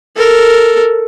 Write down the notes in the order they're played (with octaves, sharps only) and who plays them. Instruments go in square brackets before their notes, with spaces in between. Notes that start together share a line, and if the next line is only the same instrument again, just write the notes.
[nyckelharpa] A4 A#4